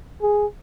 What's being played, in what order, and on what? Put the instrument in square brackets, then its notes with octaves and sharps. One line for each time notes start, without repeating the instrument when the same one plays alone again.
[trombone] G#4